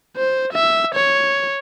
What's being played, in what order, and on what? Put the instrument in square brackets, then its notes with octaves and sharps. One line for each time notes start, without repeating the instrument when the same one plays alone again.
[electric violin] C5
E5
C#5